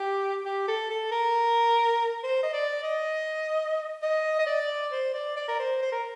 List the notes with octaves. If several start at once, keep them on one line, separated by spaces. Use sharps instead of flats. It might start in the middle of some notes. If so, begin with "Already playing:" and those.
Already playing: G4
G4
A4
A4
A#4
C5
D#5
D5
D#5
D#5
D#5
D5
C5
D5
D5
A#4
C5
C5
A#4